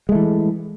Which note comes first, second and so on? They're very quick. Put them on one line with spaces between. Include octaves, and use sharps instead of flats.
G#3 A3 E3